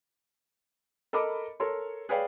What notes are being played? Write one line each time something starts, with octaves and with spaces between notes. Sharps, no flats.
A4 A#4 D#5 B5 D6
A4 A#4 C#5 C6
G#4 B4 C#5 D5 F5 G5